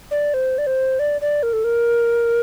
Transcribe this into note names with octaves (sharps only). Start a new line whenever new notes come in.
D5
C5
D5
C5
D5
D5
A#4
A4
A#4